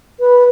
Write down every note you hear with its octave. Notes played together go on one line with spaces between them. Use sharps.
B4